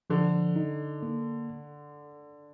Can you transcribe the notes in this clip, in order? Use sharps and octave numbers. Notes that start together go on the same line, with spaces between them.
D3 F3
D#4
A#3